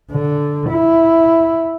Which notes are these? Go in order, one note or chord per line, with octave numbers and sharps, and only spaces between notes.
D3
E4